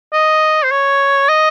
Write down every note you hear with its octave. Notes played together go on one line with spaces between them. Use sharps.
D#5
C5
C#5
D#5